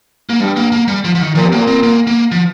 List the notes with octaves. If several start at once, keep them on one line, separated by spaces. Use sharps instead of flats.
A#3
G2 G3
A#3
A#3
G3
F3
F3
D#3
A#2 F3
C3
A#2 A#3
C4
A#3
A#3
F3